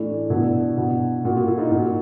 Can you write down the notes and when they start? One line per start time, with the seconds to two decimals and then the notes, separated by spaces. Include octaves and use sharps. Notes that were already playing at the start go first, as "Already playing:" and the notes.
Already playing: A2 E3 D4 E4
0.30 B2 D4 E4
0.77 B2
1.24 A#2 F#4
1.35 F4
1.47 E4
1.58 D#4 F4
1.71 A#2 E4 F#4